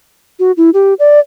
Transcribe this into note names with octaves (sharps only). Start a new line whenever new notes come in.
F#4
E4
G4
D5